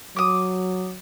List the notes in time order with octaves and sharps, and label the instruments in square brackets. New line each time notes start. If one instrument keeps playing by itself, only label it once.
[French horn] F#3 [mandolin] D6 D#6